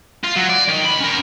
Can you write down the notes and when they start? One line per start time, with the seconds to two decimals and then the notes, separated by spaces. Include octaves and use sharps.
0.24 F4
0.37 F#3
0.50 D5
0.69 D#3
0.85 C#2 B5
1.01 C#4 A#4